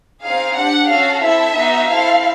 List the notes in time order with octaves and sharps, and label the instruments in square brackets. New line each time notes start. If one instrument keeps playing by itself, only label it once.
[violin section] C4 D#4 G#4 F5
D4 G4 F#5
C#4 F#4 A4 F5
C4 E4 A4 E5
B3 D#4 F#4
C4 E4 A4 F5